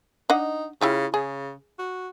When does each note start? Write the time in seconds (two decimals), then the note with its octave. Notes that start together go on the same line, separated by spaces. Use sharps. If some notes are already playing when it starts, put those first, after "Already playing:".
0.30 D4 D#4 D#5 F#5
0.81 C#3 E4 F4 G4
1.14 C#3 G#4
1.79 F#4